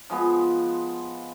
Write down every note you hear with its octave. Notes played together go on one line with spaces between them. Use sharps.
F3 G#3 B3